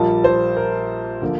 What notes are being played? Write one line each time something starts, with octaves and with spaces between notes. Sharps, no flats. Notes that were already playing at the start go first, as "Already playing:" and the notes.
Already playing: A#1 A#2 G3 A#3 F4 A5
C5
A#4
D3 F3 A#3